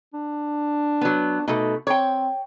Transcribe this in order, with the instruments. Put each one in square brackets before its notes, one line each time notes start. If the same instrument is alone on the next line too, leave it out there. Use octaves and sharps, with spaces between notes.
[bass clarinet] D4
[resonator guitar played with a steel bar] F#3 B3
[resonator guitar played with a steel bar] B2 A3 [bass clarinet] D#4
[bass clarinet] C4 [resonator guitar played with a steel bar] C#5 G5